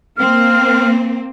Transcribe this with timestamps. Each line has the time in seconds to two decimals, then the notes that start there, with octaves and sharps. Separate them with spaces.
0.17 A#3 C4 F6